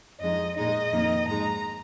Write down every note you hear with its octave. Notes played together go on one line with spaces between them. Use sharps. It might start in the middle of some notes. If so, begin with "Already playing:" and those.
F2 F3 G#3 D#4 D#5
A#2 G#3 D#4 D#5
F2 D#3 A#3 D#4
G#2 F3 G#3 D#4 A#5